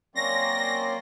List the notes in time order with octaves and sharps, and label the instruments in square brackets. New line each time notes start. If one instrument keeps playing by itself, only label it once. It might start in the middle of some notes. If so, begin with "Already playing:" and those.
[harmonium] F#3 C4 C#4 [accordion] A#3 D5 C6 [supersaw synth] A#6